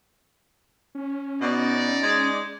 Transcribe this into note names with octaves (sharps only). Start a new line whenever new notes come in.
C#4
B2 D#4 D5
G#3